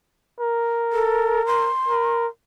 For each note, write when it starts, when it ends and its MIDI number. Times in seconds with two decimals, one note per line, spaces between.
0.40 1.70 70
0.93 1.42 69
1.47 2.22 84
1.88 2.27 70